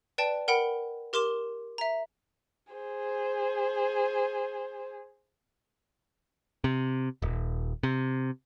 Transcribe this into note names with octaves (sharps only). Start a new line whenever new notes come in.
B4 D5 G5 A5
A#4 F#5 G5 B5
G4 A#4 C6 D6 E7 G7
E5 A#5
G#4 C5
C3
D#1
C3